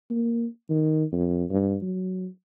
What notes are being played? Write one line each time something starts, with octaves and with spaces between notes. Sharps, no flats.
A#3
D#3
F2
G2
F#3